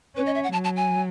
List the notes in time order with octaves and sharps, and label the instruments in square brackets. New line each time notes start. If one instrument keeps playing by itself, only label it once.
[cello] C#4 [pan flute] B4
[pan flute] D#5
E5
F#5
[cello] F#3 [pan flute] A5
[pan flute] A5
G#5